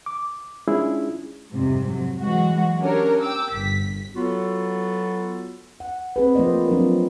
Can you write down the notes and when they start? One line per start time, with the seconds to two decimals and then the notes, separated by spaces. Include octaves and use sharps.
0.06 D6
0.68 G#3 C#4 D4 E4 F4 G#4
1.52 F2 G#2 C3 G3
1.88 F#3
2.21 E3 F#3 G#3 F#4
2.81 C#4 D4 G4 A#4 C#5
3.21 G5 D6 E6
3.53 G1 B6
4.15 F#3 B3 F4 F#4 A4
5.80 F#5
6.16 C4 G#4 B4
6.35 F3 A3 A#3 C5 D5 D#5
6.68 F3 F#3 B3 C4 D4 A#4